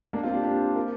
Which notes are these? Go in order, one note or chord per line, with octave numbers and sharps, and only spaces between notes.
A#3 D4
C4 F4
D4 G4
D4 G4
F4 A#4